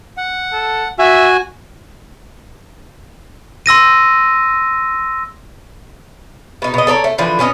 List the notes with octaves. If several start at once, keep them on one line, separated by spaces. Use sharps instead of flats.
F#5
A4
F#4 E5 G#5
C6 E6 A#6 D#7
B2 D#4
B2 D#5
A4 C#5 D5 A#5
A3
D3 E3 F3 D4
B2 C#4 A4 D#5